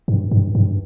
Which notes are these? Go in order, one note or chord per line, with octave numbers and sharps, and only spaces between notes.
G2
G2
G2